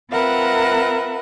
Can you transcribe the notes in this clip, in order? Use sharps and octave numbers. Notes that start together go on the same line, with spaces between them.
C4 F4 A#4 B4 E5 F#5